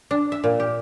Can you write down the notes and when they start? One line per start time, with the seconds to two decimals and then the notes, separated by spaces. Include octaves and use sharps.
0.11 D4
0.32 E5
0.44 A#2
0.60 G4